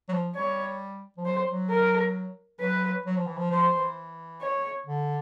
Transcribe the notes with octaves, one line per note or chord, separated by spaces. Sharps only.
F#3
F3
G3 C#5
F3
F#3 C5
F#3
A#4
F#3 B4
F#3
F3
E3
F3
F3 C5
E3
C#5
D3